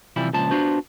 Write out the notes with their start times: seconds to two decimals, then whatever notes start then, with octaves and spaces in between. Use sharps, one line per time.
0.16 C3 E3 F3 G3 E4
0.33 C#2 A#2 F3 D4 A5
0.51 B3 D4 F4 F#4 C5